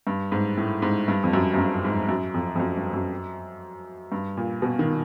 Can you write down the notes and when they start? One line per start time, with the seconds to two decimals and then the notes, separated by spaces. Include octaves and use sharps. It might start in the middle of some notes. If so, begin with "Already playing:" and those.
0.07 G2
0.32 G#2
0.57 A2
0.82 G#2
1.08 G2
1.24 F2
1.33 F#2
1.54 F#2
1.58 G2
1.84 G#2
2.09 F#2
2.34 F2
2.56 F2
2.60 F#2
2.77 G2
2.93 F#2
4.12 G2
4.37 A#2
4.62 B2
4.79 D#3